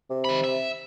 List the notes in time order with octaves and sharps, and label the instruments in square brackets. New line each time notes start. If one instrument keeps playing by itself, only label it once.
[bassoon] C3
[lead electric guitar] D#3 B5
E5